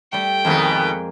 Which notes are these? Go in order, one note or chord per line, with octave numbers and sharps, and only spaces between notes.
G3 A3 G5
F2 B2 D#3 G#3 A#3 B3